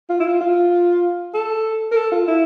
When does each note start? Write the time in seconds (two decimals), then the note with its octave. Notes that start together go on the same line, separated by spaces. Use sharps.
0.09 F4
0.20 E4
0.26 F4
0.41 F4
1.34 A4
1.92 A#4
1.96 A4
2.12 F4
2.28 E4